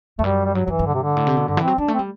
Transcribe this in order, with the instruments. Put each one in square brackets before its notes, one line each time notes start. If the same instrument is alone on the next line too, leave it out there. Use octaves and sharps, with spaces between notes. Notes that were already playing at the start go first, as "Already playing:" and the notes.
[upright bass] E2 [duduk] A3
[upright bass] F#2 [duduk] G3
[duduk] G3
[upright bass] G2 [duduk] F#3
[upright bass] F#2 [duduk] E3 F#3
[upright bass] G2
[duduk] D3
C3
D3
[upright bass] A2
C3
B2
[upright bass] G2 [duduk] D3
[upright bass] E3
[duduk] C4
[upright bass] F#3
[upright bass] G3 [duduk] D4
[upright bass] A3
[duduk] C4
[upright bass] G3